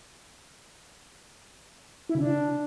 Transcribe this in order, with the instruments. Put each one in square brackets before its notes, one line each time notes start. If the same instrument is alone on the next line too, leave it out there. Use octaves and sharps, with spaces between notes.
[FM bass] E4
C#3
D4